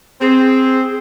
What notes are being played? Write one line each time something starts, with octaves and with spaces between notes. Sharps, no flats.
C4 G#4